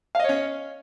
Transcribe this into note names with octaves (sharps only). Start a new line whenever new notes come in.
C#4 C#5 D#5 F5